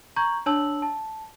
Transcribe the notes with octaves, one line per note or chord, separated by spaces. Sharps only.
A#5 C#6 G6 G#6 F#7
D4 C#5 A5 E6 F#7
A5